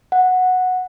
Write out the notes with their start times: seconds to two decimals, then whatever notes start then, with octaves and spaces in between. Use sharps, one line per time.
0.12 F#5